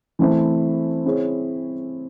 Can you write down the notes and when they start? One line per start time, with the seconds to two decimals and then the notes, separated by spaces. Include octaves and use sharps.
0.19 E3 A3 C4 E4
1.05 C4 E4 G#4 C#5